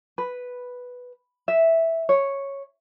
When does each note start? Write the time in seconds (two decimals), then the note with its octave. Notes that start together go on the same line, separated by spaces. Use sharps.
0.18 B4
1.48 E5
2.09 C#5